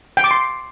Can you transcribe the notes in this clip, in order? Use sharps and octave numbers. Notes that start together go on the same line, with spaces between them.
G5
D6
C6